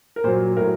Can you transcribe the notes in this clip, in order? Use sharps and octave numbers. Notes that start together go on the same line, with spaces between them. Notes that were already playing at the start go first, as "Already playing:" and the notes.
A#4
A#2 F#3 C5
A2 F#3 A#4